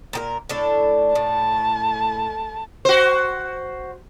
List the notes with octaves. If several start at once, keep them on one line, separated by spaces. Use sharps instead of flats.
A#2 G4 A#4
A2 D4 A4
A2 A5
F#4 C5